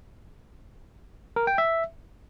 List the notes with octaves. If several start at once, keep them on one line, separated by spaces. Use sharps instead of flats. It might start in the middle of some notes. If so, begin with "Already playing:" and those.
A#4
G5
E5